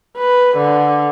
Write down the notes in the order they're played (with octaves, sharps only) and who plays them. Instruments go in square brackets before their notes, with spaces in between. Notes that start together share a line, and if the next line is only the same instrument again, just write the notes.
[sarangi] B4
D3